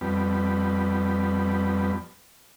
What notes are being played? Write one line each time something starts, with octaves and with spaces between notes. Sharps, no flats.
F2 G3 B3